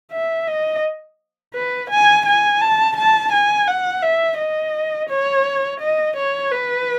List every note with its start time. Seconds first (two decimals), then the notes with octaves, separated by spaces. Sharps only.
0.12 E5
0.47 D#5
1.55 B4
1.91 G#5
2.26 G#5
2.61 A5
2.96 A5
3.32 G#5
3.68 F#5
4.03 E5
4.39 D#5
5.10 C#5
5.81 D#5
6.17 C#5
6.52 B4